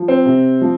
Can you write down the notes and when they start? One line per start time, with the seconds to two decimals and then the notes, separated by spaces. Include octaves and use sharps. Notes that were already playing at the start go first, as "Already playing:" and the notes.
Already playing: F3
0.08 C4
0.26 C3
0.61 F3